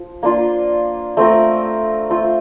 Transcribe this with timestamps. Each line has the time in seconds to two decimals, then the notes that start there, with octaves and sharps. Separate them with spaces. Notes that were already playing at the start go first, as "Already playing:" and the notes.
Already playing: F3
0.23 A#3 D4 F4
1.17 A3 C4 F4 A#4
2.10 A3 C4 F4